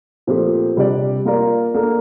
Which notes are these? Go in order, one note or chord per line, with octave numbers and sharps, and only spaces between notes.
A#2 F3 A3 C4 G4
C3 G3 D4 G4 D5
A#3 F4 A#4 D5
A#3 D4 A4